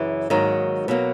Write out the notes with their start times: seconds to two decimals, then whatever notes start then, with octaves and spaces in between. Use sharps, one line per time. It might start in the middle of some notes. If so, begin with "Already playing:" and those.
Already playing: F#2 C#3 E3
0.30 G#2 D#3 F#3 A#3
0.88 B2 F#3 A#3